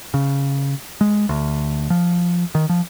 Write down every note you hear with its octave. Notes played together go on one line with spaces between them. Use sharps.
C#3
G#3
D2
F3
D#3
F3